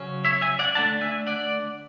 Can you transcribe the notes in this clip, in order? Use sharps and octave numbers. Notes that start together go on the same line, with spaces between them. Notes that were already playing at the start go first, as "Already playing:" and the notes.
Already playing: C#3 F#3 C#4
C#5 E5
E5 G#5
D5 F#5
D3 A3 D4 F#5 A5
E5 G#5
D5 F#5